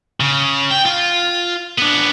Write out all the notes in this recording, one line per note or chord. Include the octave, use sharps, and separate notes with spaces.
C#3
G5
F4
B3 D4